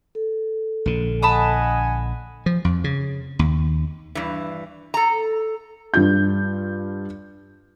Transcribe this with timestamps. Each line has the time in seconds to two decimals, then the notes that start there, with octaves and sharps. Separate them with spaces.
0.15 A4
0.86 A#1 D3
1.23 D#5 F#5 G#5 A5 B5 D#6
2.46 F3
2.65 F2
2.84 C#3
3.39 D#2
4.15 G2 E3
4.94 A4 A#5
5.94 G2 F4 G6